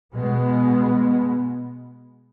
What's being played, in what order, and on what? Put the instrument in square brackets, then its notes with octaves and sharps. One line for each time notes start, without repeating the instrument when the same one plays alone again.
[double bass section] B2 G#3 B3